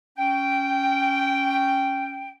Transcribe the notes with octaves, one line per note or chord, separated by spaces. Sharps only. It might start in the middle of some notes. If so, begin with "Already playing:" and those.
C#4 G5